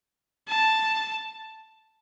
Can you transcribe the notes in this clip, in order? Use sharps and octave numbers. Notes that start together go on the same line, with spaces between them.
A5